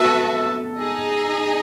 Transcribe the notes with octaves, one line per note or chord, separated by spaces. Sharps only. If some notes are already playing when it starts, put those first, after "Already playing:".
Already playing: F#4 A4 B4 E5 A5
D#4 G#4 D#5